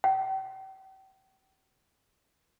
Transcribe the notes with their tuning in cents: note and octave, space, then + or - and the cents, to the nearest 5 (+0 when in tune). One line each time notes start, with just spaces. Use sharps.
G5 -40